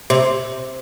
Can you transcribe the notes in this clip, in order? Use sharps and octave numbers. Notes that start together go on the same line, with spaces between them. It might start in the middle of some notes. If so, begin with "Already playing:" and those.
C3